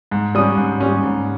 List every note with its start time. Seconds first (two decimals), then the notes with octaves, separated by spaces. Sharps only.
0.11 G#2
0.35 G3 C#4 D#6
0.58 G#2
0.80 G3 C#4
1.04 G#2